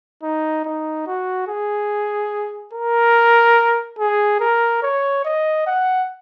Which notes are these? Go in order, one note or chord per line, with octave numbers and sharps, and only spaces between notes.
D#4
D#4
F#4
G#4
A#4
G#4
A#4
C#5
D#5
F#5